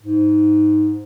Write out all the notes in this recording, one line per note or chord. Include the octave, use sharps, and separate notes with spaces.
G#2